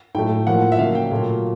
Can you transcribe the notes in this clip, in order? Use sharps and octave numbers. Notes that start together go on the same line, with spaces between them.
A2 F#3 A3 G5
A2 F3 A#3 F#5
E5
C#3 F#3 A#3 F5
G5
A#2 F#3 A3